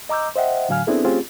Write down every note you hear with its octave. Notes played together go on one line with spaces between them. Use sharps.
D#5 A#5 D6 E6 G6
C5 D#5 E5 F#5 G5
A2 D3 F#3 F5 G#5 F6
B3 C4 D4 E4 G#4 A4
A3 C4 C#4 F4 G4 G#4